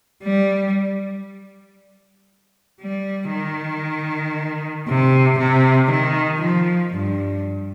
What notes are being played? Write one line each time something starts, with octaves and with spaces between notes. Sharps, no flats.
G3
G3
D#3
C3
C3
D#3
F3
G2